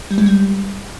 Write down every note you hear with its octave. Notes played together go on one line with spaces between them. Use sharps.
G3
G#3
G3